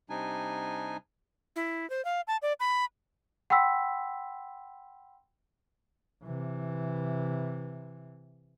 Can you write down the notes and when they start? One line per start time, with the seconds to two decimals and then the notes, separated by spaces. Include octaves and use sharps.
0.10 C3 G3 D4 D#4 G#5
1.56 E4
1.90 C5
2.05 F5
2.27 A5
2.42 D5
2.60 B5
3.50 F#5 G5 B5 C6 E6 B6
6.23 C3 E3